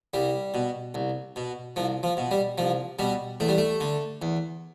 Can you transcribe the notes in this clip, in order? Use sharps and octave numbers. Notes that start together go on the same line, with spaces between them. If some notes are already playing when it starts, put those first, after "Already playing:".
C2 G3
B2
C2
B2
C2 F3
F3
B2
G3
C2 F3
B2 G3
E2 A3
G3
A3
D3
E2